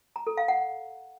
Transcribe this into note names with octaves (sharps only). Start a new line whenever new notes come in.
A#5
A4
F5
F#5